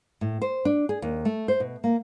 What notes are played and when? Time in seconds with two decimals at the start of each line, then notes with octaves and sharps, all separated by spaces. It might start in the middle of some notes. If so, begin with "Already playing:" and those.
0.21 A2
0.42 C5
0.65 D4
0.89 G#4
1.02 D#2
1.25 A3
1.48 C5
1.60 B2
1.84 A#3